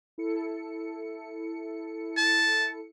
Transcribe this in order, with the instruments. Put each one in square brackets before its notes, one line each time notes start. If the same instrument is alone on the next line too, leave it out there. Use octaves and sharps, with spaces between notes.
[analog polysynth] E4 A4 C#7
[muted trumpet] A5